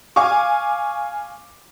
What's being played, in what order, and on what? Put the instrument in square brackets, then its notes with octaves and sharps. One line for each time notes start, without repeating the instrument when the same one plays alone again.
[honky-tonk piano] F5 G#5 C#6 D6